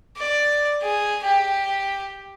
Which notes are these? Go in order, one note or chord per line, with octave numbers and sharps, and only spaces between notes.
D5
G#4
G4